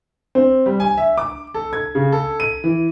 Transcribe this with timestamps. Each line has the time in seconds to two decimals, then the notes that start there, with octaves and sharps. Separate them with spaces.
0.35 C4
0.66 G3
0.80 G#5
0.97 E5
1.18 D6
1.54 A4
1.73 G#6
1.95 C#3
2.12 A4
2.40 D#7
2.64 E3